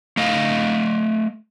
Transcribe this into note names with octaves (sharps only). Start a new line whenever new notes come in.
A3 D#5 F5